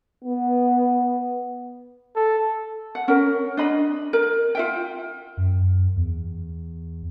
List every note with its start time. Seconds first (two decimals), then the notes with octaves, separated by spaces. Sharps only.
0.25 B3
2.16 A4
2.95 F#5
3.08 C#4 A#4
3.57 D4 D#5 B5
4.13 A#4
4.55 F4 E5 G5
5.37 F#2
5.96 E2